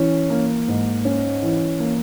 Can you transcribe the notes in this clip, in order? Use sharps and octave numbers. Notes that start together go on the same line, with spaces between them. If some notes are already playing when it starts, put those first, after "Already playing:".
Already playing: E3 C#4
A#3
G#2
C#4
E3
A#3